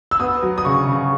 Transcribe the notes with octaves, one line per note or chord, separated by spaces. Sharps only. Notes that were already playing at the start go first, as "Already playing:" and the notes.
E6
B3 D#6
F#3
D#6
C#3 C#6
C#3